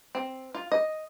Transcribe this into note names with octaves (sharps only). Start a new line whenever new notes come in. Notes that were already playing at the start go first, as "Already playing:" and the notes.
C4
F4
D#5